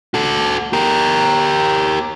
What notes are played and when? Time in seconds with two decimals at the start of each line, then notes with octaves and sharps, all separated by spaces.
0.14 F#4 A4
0.73 G4 A#4